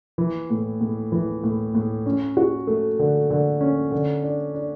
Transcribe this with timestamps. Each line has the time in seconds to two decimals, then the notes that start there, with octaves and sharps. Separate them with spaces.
0.18 E3
0.50 A2
0.81 A2
1.12 E3
1.44 A2
1.75 A2
2.06 C#4
2.37 F#4
2.67 A3
2.99 D3
3.30 D3
3.61 C#4
3.92 D3
4.23 D4
4.55 D4